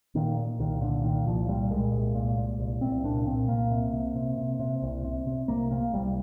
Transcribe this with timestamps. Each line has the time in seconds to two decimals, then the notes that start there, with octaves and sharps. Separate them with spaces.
0.15 A#2 D#3
0.37 A#2
0.59 C2 D#3
0.81 A#2 D3
1.04 A#2 D#3
1.26 C2 F3
1.49 A#2 G3
1.71 A#2 G#3
1.93 C2
2.15 A#2
2.38 A#2
2.60 C2
2.81 C2 C4
3.04 A#2 D4
3.26 A#2 C4
3.48 C2 A#3
3.71 C3
3.93 C3
4.16 C3
4.38 C3
4.60 C3
4.83 C2
5.04 C3
5.27 C3
5.48 C2 A#3
5.71 C3 A#3
5.93 C2 G3